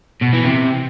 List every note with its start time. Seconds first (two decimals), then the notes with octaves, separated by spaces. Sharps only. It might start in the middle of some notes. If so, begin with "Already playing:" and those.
0.22 B2
0.34 E3
0.45 C3